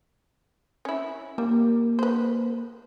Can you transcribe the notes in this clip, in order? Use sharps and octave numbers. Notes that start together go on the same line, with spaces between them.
C#4 E4
G3 A#3
B4 C5